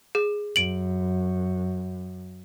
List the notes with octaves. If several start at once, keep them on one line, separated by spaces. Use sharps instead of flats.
G#4
F#2 D7 F#7